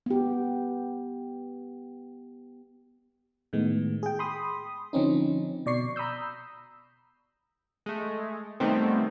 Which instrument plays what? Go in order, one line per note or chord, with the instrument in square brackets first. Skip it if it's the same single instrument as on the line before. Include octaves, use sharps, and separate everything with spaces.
[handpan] B3 G4
[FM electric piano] A2 D#3 G#3 B3
G#4 G5
B5 C6 D#6
D3 F3 C4 C#4 D#4
B2 D5 C#6 C7
A#5 B5 D#6 E6 G6
[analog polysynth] G#3 A3
C3 D#3 G3 A3 B3 C4